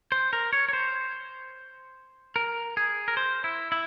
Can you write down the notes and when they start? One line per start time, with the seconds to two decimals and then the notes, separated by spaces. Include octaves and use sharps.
0.12 C5
0.33 A#4
0.53 C#5
0.68 C#5
0.73 C5
2.36 A#4
2.77 G#4
3.08 A#4
3.17 C5
3.44 E4
3.72 E4